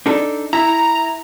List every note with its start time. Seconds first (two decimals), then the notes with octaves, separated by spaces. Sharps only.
0.06 D4 D#4 A4
0.53 E4 A#5